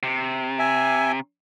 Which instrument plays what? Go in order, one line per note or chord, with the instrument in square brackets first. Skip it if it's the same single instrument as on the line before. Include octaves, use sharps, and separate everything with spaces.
[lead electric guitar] C3
[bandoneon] E5 G#5